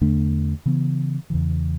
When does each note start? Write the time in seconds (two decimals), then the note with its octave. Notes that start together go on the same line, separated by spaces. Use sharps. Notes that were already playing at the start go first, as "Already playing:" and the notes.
0.01 E2 D3 A3 D4
0.66 C#3 E3 B3
1.30 E2 C#3 E3